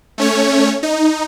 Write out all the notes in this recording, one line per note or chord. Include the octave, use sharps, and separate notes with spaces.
A3 C#4 C#5
D#4